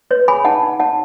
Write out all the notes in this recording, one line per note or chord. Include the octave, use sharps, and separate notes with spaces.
B4 C#5
G#4 G#5 B5
D#4 F#5 A5
D#4
C#5 F#5 A5